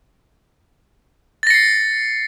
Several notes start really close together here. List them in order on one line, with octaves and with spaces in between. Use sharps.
A6 A#6 C#7 C7